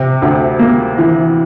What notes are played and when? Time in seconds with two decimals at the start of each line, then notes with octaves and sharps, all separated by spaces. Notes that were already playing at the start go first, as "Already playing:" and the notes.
Already playing: C3
0.22 D2
0.59 A#3
0.98 E3